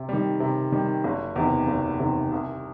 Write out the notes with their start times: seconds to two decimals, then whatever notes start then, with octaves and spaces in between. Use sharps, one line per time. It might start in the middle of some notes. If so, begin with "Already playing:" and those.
Already playing: C3
0.09 D#3 G3
0.40 C3
0.72 D#3 G3
1.04 F#1
1.36 E2 C3 D#3
1.68 F#1
1.99 E2 C3 D#3
2.32 C2